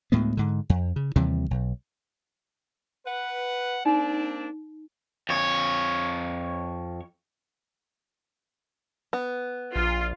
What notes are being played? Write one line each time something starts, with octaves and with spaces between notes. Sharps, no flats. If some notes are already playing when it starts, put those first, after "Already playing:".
D2 A2 G#3 B3
G#2 D3
F2
C#3
D#2 C3 E3 G3
B1
B4 F#5
A#3 C4 D4 D#4
F2 C#5
B3
A#1 F4